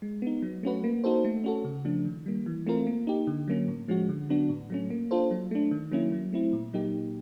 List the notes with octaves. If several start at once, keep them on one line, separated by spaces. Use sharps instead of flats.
G#3
B3 D#4
F#3
A3 C#4 F#4 B4
A#3
D#4 F#4 A4 C5
A3
C#4 F#4 A4
C#3
F3 A3 D4
D#3
G3 A#3
E3
A3 C4 F4 A#4
A#3
D#4 G4
D3
F#3 A#3 C#4
A2
F3 G#3 C#4 F#4
D3
F#3 B3 D4 F#4
A2
F#3 A3 C#4
A#3
D4 F4 A4 C5
F#3
A3 D4
D#3
F#3 A#3 C#4 E4
F#3
A3 C4 E4
A#2
F#3 A#3 D#4 G4